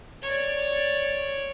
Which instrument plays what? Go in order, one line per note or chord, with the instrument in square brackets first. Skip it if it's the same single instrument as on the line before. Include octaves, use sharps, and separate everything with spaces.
[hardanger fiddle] C#5 D5